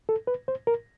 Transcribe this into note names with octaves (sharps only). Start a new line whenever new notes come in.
A4
B4
C5
A#4